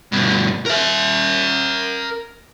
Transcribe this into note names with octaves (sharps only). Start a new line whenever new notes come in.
G2 B2
A#4 E5